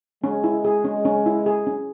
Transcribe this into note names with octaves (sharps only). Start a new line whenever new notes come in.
G#3 C#4
E4
G#4
C#4
C#4
E4
G#4
C#4